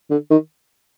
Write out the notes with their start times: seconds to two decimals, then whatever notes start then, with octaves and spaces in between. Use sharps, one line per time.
0.11 D3
0.30 D#3